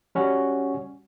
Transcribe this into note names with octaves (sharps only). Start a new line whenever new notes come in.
G3 C#4 F#4